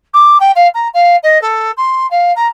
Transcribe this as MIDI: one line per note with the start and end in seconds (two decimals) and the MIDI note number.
0.14 0.38 86
0.40 0.51 79
0.56 0.68 77
0.75 0.88 82
0.94 1.16 77
1.23 1.41 75
1.42 1.72 69
1.77 2.09 84
2.11 2.33 77
2.36 2.46 82